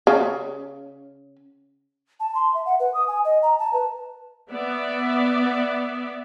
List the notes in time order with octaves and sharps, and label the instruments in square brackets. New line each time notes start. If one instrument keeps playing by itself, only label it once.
[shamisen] C#3
[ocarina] A5
C6
E5
F#5
B4
D#6
G#5
D#5
A#5
A5
B4
[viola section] B3 D5 E5